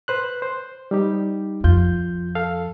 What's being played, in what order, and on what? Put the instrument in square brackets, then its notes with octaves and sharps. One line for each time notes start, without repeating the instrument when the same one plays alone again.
[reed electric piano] B4 C5 F#6
C5
G3 D#4 G4
[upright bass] F2 [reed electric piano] F4 G6
[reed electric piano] A4 F5